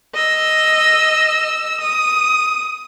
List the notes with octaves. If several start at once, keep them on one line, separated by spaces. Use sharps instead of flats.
D#5 E6
D#6